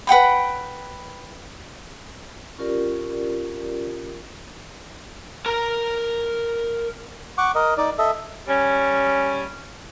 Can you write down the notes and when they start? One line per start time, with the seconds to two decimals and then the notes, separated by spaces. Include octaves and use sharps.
0.07 B4 F#5 G5 B5
2.58 C#4 F4 G4 A#4 D5
5.46 A#4 A#5
7.38 F#5 C#6 D6
7.55 A#4 D#5
7.78 D#4 D5
7.98 A4 D#5 E5
8.47 G3 C#4